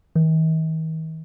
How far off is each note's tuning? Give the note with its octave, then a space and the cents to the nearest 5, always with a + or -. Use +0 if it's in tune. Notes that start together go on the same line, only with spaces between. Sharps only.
D#3 +45